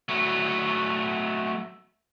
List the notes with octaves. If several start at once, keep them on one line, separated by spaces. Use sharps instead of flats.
F#3 A3